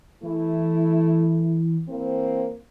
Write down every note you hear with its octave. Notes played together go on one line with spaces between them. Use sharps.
E3 A3 E4
E3 A#3 C4